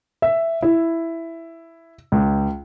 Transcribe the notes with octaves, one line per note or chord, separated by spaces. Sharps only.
E5
E4
C#2